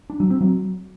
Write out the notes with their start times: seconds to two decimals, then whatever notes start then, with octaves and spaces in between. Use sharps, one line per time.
0.10 D4
0.20 F#3
0.30 C4
0.41 F#3